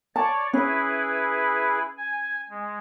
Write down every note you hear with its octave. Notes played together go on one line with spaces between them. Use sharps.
C#5 D5 A5
C#4 E4 G#4 B4
G#5
G#3